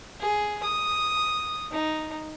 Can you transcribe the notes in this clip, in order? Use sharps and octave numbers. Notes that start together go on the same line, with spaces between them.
G#4
D#6
D#4